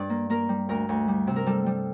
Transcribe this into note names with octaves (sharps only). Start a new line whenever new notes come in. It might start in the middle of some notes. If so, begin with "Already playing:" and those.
Already playing: G2 D5 G5
A#3
A#3 A#4
G3
D2 A#4
D2
G3
C3
A#4
G3 A4
G3